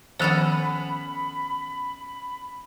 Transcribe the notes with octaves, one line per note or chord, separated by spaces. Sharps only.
D#3 F3 B3 C#4 A4 C5 B5